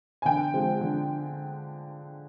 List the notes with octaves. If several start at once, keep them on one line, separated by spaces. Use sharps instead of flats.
G#5
D3 G5
F3 G#3 C4
D3